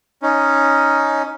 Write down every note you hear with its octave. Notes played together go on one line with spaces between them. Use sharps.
C#4 D#4